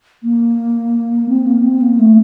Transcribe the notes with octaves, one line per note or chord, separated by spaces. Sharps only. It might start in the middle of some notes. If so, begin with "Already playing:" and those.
A#3
C4
A#3
C4
A#3
A3